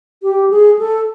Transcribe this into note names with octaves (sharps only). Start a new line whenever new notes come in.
G4
G#4
A4